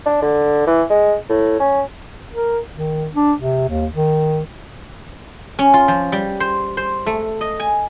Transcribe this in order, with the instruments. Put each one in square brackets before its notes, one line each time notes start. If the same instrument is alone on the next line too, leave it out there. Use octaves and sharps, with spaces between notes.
[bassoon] D4
D3
E3
G#3
A2
C#4
[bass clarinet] A#4
D#3
D4
C3
D#2
D#3
[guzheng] C#4
F4
F3
G3
C5
C5
A3
D#5
G#5